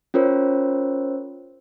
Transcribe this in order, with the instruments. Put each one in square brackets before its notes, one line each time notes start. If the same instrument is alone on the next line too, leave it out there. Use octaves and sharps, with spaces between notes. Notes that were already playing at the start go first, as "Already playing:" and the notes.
[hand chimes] C#4 F4 A#4 C5 C#5